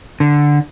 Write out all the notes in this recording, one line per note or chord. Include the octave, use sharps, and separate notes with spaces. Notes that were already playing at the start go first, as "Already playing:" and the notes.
D3